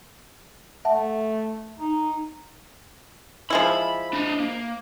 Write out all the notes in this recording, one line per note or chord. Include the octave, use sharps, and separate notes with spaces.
A3 E5 F#5 A5
D#4
F3 G#3 E4 B5
D4 D#5
A#3